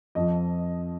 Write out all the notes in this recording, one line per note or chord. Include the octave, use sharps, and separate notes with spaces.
F2 F3 D#5